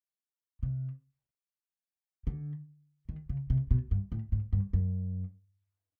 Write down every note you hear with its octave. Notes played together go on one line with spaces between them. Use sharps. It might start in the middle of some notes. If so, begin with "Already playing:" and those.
C3
D3
D#3
C#3
C3
B2
G2
A2
G#2
G2
F#2